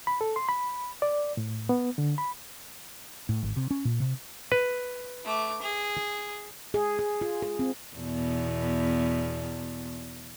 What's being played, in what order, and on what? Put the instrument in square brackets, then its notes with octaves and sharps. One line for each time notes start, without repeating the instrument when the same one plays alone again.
[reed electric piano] B5
A4
C6
B5
D5
A2
B3
D3
B5
[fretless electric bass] A2
G#1
C3
C#4
A#2
C3
[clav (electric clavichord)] B4
[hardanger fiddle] A3 D6
G#4
[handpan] G#4
G#4
F4
G#4
C4
[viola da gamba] E2 B2